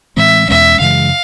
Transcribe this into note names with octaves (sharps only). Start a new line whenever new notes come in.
A2 E3 G#3 C4 E5
E2 B2 G#3 C#4 E5
F#2 C#3 E3 G#3 F5